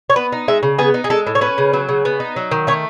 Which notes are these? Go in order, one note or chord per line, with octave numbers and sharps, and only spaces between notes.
C#5
B3 B4
D#4
G#3 E5
C#3
B3 G#4
D#4
G#4
G#3 A4
A2
C#5
C#4 B4
C#3
F#3
C#3
B3
D#4
F#3
D#3
A3 C#5